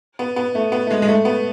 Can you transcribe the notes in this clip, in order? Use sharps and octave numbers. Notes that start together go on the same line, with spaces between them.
B3
B3
A3
B3
A3
G#3
G#3
A3
B3